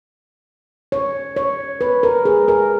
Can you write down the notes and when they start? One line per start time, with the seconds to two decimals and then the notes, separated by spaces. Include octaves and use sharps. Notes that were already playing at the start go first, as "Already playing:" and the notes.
0.92 C#5
1.36 C#5
1.81 B4
2.03 A#4
2.25 G#4
2.48 A#4